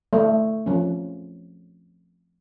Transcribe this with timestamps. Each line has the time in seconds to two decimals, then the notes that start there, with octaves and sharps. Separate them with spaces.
0.13 A3
0.66 F3 C#4